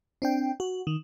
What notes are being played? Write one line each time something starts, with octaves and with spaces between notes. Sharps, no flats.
C4 D4 G5
F#4
D#3